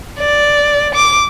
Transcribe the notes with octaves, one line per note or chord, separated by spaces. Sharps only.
D5
D6